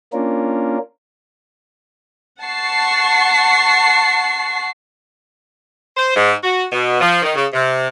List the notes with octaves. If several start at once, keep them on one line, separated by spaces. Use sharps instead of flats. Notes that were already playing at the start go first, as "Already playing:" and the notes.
A#3 C#4 D4 F4 A#4
F#5 A5 C#6 C7
C5
G#2
F#4
B2
F3
D#3
C#3
C3